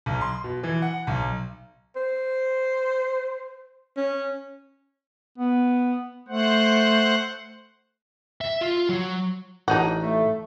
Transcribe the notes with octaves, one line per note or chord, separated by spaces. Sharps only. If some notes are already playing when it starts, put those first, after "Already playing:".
B1
C6
B2
E3
F#5
B1
C5
C#4
B3
A3 C5 F#5
E5
F4
F#3
A1 D4 D#4 F#4
A3